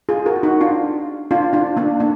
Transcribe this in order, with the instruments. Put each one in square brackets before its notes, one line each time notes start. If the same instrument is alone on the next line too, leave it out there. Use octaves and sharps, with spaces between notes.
[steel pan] F4 G#4
F#4 A#4
D#4 F#4
D4 F4
D4 F4
D4 F4
A#3 D4
A#3 D4